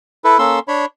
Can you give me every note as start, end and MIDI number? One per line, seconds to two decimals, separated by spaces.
0.24 0.38 64
0.24 0.38 69
0.24 0.38 71
0.39 0.59 58
0.39 0.59 61
0.39 0.59 69
0.39 0.59 84
0.39 0.59 88
0.68 0.85 62
0.68 0.85 73
0.68 0.85 83